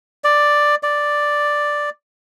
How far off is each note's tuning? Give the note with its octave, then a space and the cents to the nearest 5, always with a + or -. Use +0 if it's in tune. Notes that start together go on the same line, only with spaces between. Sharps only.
D5 +5
D5 +0